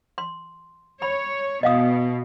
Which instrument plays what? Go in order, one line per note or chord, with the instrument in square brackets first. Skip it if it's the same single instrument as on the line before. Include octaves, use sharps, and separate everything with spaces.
[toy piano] C6
[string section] C#5 [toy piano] B5
[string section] B2 [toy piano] D#5 F5 D#6